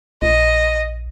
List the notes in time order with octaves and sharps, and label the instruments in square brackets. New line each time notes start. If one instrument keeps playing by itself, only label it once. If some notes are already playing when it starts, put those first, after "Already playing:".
[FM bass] A#1 [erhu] D#5